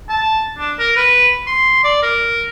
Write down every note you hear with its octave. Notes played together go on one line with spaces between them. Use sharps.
A5
D4
A#4
B4
C6
D5
A#4